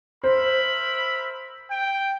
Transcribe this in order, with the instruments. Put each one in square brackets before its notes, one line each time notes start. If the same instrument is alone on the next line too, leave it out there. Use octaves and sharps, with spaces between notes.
[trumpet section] A#4 E5 B5 [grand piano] C5
[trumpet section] G5